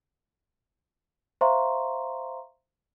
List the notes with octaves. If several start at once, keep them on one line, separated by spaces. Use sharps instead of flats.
C5 E5 F5 A#5 C6 C#6